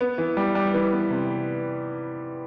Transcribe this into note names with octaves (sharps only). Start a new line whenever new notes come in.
B3
E3
G3
G3
E3
B3
C3